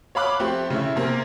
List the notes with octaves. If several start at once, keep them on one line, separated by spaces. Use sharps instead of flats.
C#5 F5 B5 D6 F#6
F3 A3 C4 G4
C#3 A3 E4
C3 A#3 C4